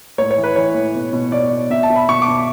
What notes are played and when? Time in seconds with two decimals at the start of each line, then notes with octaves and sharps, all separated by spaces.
0.18 A2 C#5
0.31 C#5
0.38 E3
0.43 B4
0.56 E3 C#5
0.75 A2
0.95 B2
1.13 B2
1.32 B2 D5
1.51 B2
1.70 B2 E5
1.83 A5
1.90 B2
1.96 B5
2.09 B2 C#6
2.22 D6
2.28 B2